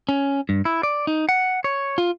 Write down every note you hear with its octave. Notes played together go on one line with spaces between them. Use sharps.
C#4
G2
E4
D5
D#4
F#5
C#5
F4